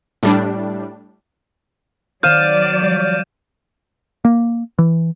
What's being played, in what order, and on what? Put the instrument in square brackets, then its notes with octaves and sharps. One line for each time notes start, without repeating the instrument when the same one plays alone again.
[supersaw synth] A2 G3 D4
[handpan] D#3 C5 [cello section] F#3 D5 [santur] F5 [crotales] G6 D#7 E7
[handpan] F3 G3 C#5
[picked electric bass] A#3
E3